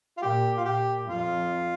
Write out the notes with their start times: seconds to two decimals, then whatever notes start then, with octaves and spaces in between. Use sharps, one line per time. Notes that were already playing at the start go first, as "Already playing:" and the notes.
0.17 F4
0.22 A#2 G4
0.57 F4
0.65 A#2 G4
1.07 F2 F4